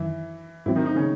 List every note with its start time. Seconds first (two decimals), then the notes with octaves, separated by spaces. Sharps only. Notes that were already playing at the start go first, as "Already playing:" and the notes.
Already playing: F#2 D#3 E3 F#3 E4
0.66 G#2 E3 F#3 C4 E4
0.76 D#3 D#4
0.86 D#3 D#4
0.95 C#3 C#4